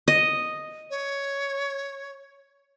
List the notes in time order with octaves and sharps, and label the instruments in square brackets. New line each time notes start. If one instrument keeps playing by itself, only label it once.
[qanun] D#5
[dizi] C#5